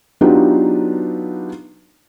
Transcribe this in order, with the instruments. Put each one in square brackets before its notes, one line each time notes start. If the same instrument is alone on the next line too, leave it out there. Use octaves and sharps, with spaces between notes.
[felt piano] F#3 B3 D4 D#4 F4 G4